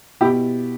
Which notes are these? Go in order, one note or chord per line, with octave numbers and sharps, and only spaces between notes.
B2 E4 G4